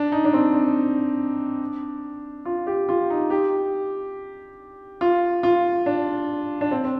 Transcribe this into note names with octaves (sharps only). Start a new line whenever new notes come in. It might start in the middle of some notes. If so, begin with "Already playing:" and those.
Already playing: D4
D#4
D4
C4
D4
F4
G4
F4
D#4
G4
F4
F4
D4
D4
C4
C4